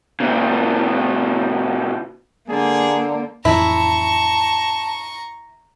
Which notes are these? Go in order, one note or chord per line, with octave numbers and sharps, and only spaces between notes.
A#2 C#3
D3 A#3 G#4
F2 A2 E3 E4 A5 A#5 C#6